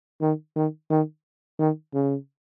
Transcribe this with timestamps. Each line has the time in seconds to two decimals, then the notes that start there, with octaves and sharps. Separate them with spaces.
0.22 D#3
0.56 D#3
0.91 D#3
1.59 D#3
1.94 C#3